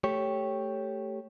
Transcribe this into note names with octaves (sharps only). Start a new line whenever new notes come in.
A3 G4 C#5